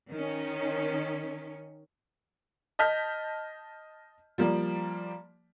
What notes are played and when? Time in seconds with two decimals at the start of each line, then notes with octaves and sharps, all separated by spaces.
0.10 D#3 C#4
2.79 D#5 A5 F6 G6 B6
4.38 F3 G3 A#3 D5